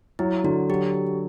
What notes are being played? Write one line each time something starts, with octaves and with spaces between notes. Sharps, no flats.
F#3 E4
D3 F#4
F#3 G4